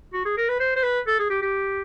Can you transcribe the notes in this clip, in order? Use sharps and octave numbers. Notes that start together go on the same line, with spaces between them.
F#4
G#4
A#4
B4
C5
C5
B4
A4
G#4
G4
G4